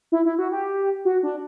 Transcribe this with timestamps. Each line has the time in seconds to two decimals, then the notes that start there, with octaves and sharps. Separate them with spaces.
0.12 E4
0.25 E4
0.38 F#4
0.52 G4
1.05 F#4
1.23 D4